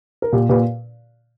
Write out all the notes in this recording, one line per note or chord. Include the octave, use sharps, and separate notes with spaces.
A#4
A#2 G4
A#2 G4 B4